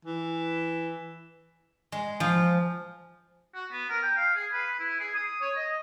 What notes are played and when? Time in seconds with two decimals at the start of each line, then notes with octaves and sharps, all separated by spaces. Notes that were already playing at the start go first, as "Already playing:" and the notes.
0.05 E3
1.92 G#3
2.20 F3
3.54 F#4
3.72 B3
3.89 A#4
4.03 G5
4.16 F5
4.35 G#4
4.52 B4
4.80 E4
5.00 G#4
5.15 D#6
5.41 C#5
5.56 D#5